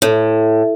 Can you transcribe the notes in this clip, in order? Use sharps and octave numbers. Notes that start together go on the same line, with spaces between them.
A2